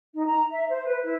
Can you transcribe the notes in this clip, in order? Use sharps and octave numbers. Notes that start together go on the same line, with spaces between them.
D#4
A#5
E5
C5
B4
E4